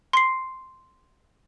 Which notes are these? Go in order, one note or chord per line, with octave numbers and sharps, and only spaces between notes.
C6 C7